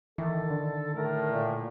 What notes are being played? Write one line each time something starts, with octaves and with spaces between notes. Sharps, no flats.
D#3 E3 A4
D3
A2 A#4
A#2